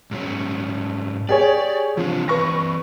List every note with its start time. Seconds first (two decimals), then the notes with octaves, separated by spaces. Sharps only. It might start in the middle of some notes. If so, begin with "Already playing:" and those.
0.11 G#2 F#3 C#4
1.29 G4 G#4 C#5 D5
1.97 E3 F3 C4 D4
2.28 E3 C4 B4 C#6 A#6